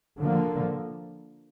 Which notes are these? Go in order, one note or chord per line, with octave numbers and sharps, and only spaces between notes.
D3 F3 A#3